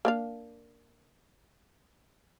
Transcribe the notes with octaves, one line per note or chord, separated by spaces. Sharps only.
A#3 D4 F5